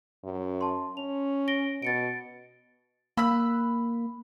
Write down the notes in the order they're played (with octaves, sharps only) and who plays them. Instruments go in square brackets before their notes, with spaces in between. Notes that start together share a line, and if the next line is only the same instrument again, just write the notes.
[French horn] F#2
[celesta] A5 C6
[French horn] C#4 [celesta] F7
[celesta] A#6 D7 G7
[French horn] B2 [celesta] A6 C#7 D7
[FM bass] A#3 [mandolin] B5 E6 F#6